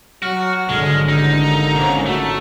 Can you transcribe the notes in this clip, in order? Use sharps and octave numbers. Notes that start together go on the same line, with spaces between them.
F#3 F#4 F6
G#1 D3 G#3
A1 D#4
D#2 A#5
C2 G#2 A#3 C4 C#4
G#1 F2 A3 F#4